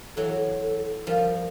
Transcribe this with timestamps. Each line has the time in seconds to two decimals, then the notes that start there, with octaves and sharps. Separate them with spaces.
0.17 E3 F#3 A4
0.63 A4
1.07 F3 G3 A#4